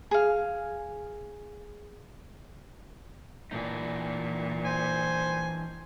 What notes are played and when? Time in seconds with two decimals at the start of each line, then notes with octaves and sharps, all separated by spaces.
0.11 G#4 F5
3.51 A#2 E3 D4 D#4
4.64 C5 G#5